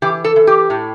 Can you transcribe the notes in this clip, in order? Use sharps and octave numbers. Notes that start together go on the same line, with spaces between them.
E3 G4
A4
E3
G4
A2